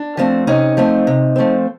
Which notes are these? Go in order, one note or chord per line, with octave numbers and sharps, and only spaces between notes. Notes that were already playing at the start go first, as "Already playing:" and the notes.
Already playing: D4
F3 A3 C4
C3 C#4 D#4
F3 A3 C4
C3
F3 A3 C4